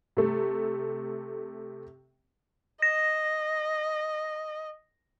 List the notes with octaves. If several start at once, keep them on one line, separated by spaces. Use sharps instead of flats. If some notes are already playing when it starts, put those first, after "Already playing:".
C3 A3
D#5 A#6